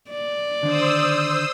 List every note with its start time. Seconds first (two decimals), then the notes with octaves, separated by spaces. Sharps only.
0.10 D5
0.63 D3 D#3 D4 C5 D#6 E6